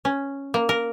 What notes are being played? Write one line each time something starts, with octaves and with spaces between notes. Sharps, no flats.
C#4
A#3
A#4